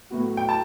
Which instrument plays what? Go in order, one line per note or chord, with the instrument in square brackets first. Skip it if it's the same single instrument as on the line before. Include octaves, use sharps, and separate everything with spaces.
[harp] A2 F#3 B3 F#4
[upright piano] G5
A5